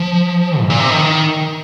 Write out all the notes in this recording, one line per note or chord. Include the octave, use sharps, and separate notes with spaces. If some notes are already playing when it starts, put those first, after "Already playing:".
Already playing: F3
G#2
A#2
C3
D#3